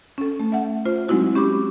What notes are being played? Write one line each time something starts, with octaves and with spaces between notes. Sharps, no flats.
C#4 A4
A3
E5 F#5
F4 C5
F#3 G#3 C4 D#4 E4 F#4
C#4 G4 B5 D6